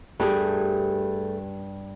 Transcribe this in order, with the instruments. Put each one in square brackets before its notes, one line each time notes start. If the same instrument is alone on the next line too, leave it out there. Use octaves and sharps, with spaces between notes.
[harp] G2 [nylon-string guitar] A3 G4 G#4